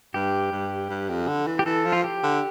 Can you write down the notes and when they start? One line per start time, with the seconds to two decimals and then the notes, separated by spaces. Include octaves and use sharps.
0.14 G2 G4
0.52 G2
0.90 G2
1.09 F2
1.28 D3
1.47 E3
1.59 G4
1.66 E3 A4
1.85 F3
1.92 F4
2.04 G4
2.23 D3